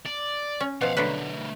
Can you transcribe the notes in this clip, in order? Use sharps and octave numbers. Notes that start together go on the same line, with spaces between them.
D5
C#4
B2 F3 F5 F#5
D3 F#3 A3 B3 B4